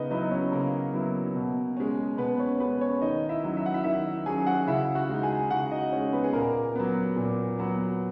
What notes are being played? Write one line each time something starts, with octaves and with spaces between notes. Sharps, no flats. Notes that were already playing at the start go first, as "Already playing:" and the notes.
Already playing: C#3 B3 D#4 B4 D#5
F#3 B3 D#4 E4 D#5
B4
C#4 C#5
C#3 A#3 A#4
F#3 B3 E4
B2
G#3 C#4
B2 B3 B4
C#4 C#5
G#3 B3 C#4 B4
C#4 C#5
D#3 D#4 D#5
E4 E5
F#3 C#4
E5
F#5
E4 E5
D#3 E4 E5
F#3 C#4 G#4 G#5
F#4 F#5
C#3 E4 E5
F#4 F#5
G#3 D#4
G#4 G#5
C#3 F#4 F#5
D#4 D#5
G#3 C#4 D#4 C#5
B3 B4
G#4
A#2 A#3 A#4
F#3 B3
A#2
F#3 B3